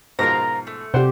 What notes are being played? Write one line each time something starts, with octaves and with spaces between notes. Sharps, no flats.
G#2 B2 F3 F4 A#4 A#5
A3
C3 G4 C5 D5 F#5